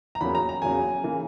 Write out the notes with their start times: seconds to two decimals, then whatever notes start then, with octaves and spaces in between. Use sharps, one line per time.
0.15 A#5
0.20 E2 C#3 F#3 A#3 B5
0.35 A#5
0.49 A#5
0.62 E2 C#3 F#3 A#3 G#5
1.04 C#3 E3 A#3